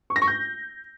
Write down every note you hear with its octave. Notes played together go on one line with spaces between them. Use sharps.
C#6
A#6
C#6
G6